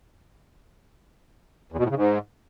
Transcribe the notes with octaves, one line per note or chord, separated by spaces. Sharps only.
E2
B2
A2
C#3
G#2